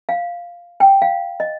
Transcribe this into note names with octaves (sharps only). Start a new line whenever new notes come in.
F5
G5
F5
D#5